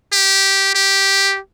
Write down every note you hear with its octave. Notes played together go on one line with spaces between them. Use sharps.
G4
G4